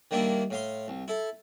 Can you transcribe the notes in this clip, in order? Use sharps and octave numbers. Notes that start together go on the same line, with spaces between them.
D#3 G3 A#3 D4 E4
A2 F5 C6
C2
E4 A4